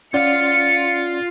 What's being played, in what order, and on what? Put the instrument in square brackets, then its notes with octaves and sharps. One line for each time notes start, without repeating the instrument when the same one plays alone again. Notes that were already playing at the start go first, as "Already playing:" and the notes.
[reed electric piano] C#4 D5 F#5 [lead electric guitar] F4 F5 [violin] C#7